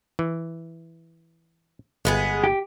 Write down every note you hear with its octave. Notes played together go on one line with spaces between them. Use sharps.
E3
G1 G#3 B3 G#4
G4